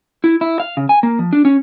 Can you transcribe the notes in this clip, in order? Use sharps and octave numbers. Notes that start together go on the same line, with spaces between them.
E4
E4
F5
C#3
G#5
A#3
F3
D4
C#4